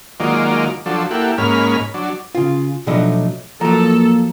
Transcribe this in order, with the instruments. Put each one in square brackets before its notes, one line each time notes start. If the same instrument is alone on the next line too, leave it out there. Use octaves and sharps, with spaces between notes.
[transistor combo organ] D#3 F#3 G#3 A#3 F4 D5
F3 F#3 D4 A4
A#3 E4 G4 A4 F#5
G#2 A#3 C#4 B5 F6
F#3 D4
[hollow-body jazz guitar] C#3 F4
B2 F3 F#3 A3 D4 D#4
[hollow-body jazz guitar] F3 F#3 [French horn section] A#3 [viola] A4 [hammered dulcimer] A#5